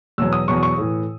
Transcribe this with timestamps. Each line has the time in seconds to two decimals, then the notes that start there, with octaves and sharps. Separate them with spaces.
0.18 E2 B2 F#3 E6
0.33 D#6
0.48 E2 B2 F#3 C#6
0.63 C#6
0.78 A2 E3